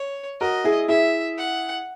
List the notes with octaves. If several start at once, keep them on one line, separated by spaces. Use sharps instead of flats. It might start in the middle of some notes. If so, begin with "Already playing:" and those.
Already playing: C#5
F#4 A#4 D#5
E4 G#4
E4 G#4 E5
F#5